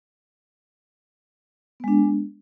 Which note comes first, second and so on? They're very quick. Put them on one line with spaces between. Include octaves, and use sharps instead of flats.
B3 G#3 D4